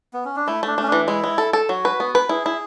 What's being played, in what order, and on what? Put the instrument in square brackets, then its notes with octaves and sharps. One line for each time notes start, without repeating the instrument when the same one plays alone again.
[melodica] B3
C#4
D4
[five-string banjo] A3 [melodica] E4
[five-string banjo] A3 [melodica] D4
[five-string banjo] A3 [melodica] C#4
[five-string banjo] E3 [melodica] D4
[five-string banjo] G#3 [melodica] E4
[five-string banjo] G#3
A4
A4
[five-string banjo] F#3 [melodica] F#4
[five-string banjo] B4
B3
B4
[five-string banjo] E4 [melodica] G#4
[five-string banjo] E4